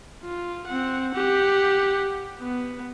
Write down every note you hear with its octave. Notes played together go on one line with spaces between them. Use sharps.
F4
C4 F#5
G4 F#5
B3